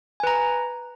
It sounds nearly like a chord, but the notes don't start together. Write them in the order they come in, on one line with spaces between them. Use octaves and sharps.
G#5 B4 A#5